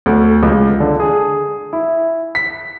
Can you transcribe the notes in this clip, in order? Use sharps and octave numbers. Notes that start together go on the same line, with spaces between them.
D2
C#2
D3
G#4
E4
B6